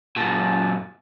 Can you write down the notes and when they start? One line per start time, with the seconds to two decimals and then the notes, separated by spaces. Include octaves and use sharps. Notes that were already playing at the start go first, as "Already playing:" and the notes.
0.17 F#2 A#2 A5